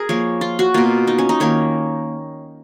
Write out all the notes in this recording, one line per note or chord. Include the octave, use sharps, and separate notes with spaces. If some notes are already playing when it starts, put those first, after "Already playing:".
Already playing: G#4 A#4
F3 A#3 C#5
F4
F#4
B2 A#3 F4
D#4
C#4
D#4
D#3 A#3 C#5